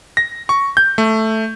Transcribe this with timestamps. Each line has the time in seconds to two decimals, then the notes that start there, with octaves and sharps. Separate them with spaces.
0.17 A#6
0.49 C#6
0.77 G6
0.98 A3